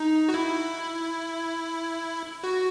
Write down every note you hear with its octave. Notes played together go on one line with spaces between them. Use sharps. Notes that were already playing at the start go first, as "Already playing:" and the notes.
Already playing: D#4
F#4
E4
F#4